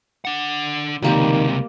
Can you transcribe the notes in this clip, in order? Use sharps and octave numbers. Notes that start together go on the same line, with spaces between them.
D4 F#5
C#2 C3 D#3 G3 A#3 G4